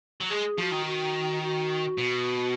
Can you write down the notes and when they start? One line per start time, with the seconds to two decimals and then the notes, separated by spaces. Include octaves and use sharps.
0.21 F#3
0.30 G#3 G#4
0.58 F3 F#4
0.72 D#3
0.86 F#4
1.42 F#4
1.98 B2